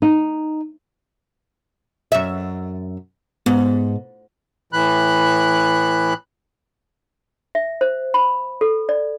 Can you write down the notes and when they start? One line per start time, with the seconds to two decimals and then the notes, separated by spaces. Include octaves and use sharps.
0.02 D#4
2.12 F#2 E5
3.46 G#2 B3
4.73 A2 E3 B5 F#6
7.55 E5
7.81 C5
8.14 B5
8.61 A4
8.89 D5